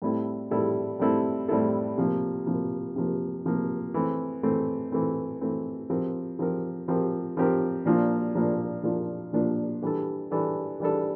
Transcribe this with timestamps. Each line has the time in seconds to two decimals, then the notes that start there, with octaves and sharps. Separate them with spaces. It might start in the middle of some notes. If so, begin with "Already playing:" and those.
0.02 A2 G3 C4 E4 A4
0.51 A2 G3 C4 E4 A4
1.00 A2 G3 C4 E4 A4
1.48 A2 G3 C4 E4 A4
1.98 C3 F3 A#3
2.46 C3 F3 A#3
2.96 C3 F3 A#3
3.45 C3 F3 A#3
3.94 E3 A3 C4
4.43 E3 A3 C4
4.92 E3 A3 C4
5.41 E3 A3 C4
5.90 F3 C4 G4 A#4
6.39 F3 C4 G4 A#4
6.88 F3 C4 G4 A#4
7.37 F3 C4 G4 A#4
7.86 A#2 F3 A#3 D4 F4
8.35 A#2 F3 A#3 D4 F4
8.83 A#2 F3 A#3 D4 F4
9.33 A#2 F3 A#3 D4 F4
9.82 E3 G3 D4 A4
10.31 E3 G3 D4 A4
10.80 E3 G3 D4 A4